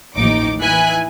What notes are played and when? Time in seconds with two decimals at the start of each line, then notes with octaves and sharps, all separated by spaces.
0.16 A1 D#2 F3 D#4 D6
0.59 E3 D#4 E4 G#5 F#6 B6